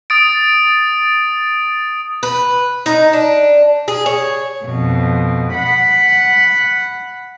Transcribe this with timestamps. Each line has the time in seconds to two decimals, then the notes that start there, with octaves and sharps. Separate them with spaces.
0.10 D#6 A6 D7
2.23 B4
2.86 D#4
3.13 D4
3.88 G#4
4.06 C#5
4.65 F2 B2
5.54 F#5 B5